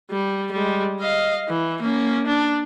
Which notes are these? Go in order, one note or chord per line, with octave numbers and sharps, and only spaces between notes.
G3
G3 G#3
D#5 F5
E3
A#3 C#4
D4